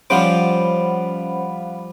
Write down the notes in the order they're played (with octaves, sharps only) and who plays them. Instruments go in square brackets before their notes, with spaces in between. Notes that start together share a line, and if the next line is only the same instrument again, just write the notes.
[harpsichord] F3 G3 D6 [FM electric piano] C#4 C5 [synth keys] F5 F#5 B5